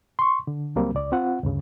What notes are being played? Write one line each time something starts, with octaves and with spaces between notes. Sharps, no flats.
C6 C#6
D3
C#2 F#3 G3 A#3 C4
C#2 D5
C4 F4 F#5
D2 G2 C#3